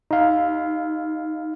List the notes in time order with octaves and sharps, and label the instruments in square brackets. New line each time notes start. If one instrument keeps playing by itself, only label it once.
[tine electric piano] D#4 F5